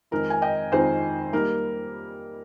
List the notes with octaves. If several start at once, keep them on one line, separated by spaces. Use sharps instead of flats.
F2 D#3 G#3 C4 D#4 A#4
G#5
D#5 G5
F2 D#3 G#3 C4 D#4 G#4 C5
G3 A#3 D#4 A#4